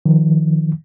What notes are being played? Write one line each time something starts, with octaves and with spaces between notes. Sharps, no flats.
D#3 F3